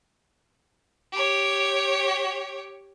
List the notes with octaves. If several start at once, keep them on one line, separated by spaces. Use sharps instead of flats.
G4 C#5